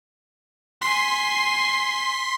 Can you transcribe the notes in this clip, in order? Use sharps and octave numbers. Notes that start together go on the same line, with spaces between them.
G#5 C6 B6 C7